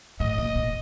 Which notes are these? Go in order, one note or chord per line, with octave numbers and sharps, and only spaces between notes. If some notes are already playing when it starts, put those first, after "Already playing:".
A2 D#5
A#2
B2